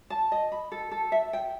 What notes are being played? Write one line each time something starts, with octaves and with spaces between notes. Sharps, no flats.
A5
D#5
B5
A4
A4
E5
G5